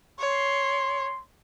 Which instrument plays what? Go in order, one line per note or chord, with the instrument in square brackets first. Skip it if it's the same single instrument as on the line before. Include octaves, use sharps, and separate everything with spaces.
[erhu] C#5 [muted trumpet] C6